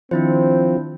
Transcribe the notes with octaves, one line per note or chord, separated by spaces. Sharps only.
D#3 F3 C4 D4 E4 C5